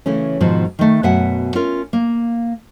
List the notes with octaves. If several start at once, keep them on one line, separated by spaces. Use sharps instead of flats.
C#3 E3 A3 C#4
G#2 B2 D#3 F3
D#3 A3
F#2 B2 E5 F#5 G#5
C#4 F4 A#4
A#3